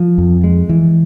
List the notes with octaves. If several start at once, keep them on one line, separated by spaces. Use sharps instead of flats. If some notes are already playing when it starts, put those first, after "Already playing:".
Already playing: F3
F2
G#3
E3